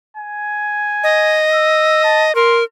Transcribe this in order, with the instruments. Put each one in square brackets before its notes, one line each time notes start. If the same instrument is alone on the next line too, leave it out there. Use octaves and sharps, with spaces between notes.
[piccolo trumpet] G#5
[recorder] D#5
[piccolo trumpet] E6
A5
[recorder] A#4 [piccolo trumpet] C6